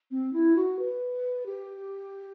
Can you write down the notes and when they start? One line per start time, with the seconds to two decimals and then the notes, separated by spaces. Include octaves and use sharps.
0.11 C4
0.33 E4
0.56 F#4
0.79 B4
1.46 G4